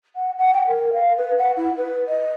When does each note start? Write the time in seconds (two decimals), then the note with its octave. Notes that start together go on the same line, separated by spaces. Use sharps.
0.16 F#5
0.38 F#5
0.54 G5
0.68 A#4
0.93 F5
1.17 B4
1.39 F#5
1.57 E4
1.77 B4
2.08 D#5